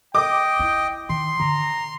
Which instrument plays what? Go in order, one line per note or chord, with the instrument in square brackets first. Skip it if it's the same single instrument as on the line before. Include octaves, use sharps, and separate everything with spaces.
[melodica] D#5 [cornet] G5 [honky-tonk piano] D6
[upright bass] E4
[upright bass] D#3 [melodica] C6
[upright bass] D3 [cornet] A#5